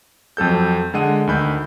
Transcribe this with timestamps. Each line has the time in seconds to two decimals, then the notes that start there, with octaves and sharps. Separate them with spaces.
0.37 F2 F#3 A4 G6
0.94 D3 G#3 F#5 D#7
1.27 D2 D#3 B5 G6